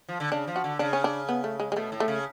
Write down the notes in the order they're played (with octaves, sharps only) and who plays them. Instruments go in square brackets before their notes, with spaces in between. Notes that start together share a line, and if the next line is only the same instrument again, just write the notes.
[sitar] F3
D3
[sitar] C#3 [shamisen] D4
[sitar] F3
[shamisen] F#4
[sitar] D3
[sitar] C#3 [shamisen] D4
[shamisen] C#4
D4
B3
A3
G#3
G#3
[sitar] B2 [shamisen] A3
[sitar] A2
[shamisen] A3
[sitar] C#3